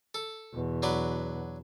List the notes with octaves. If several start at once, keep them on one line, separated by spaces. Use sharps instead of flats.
A4
E2 B2
F#3 D4 B4